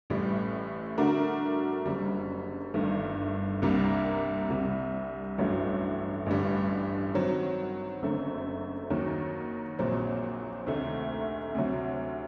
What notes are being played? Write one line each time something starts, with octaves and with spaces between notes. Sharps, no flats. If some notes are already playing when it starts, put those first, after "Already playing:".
A1 A2 G3
D3 A3 D4 F#4 A#4
F#1 F#2 D3 G3
G1 G2 D#3 A3
C2 C3 G3 A#3 D4
C2 C3 G3
A1 G2 F#3 A3
A1 G2 D3 G3
D#3 F#3 C4
F#1 F#2 D3 A3 C4
D#2 D#3 F#3
A#1 A#2 F#3 C4
D2 C3 D#3 A3 D#4
D2 C3 F#3